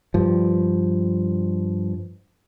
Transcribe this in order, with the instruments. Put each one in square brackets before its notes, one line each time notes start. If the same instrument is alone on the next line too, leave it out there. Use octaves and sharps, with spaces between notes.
[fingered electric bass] G2 F3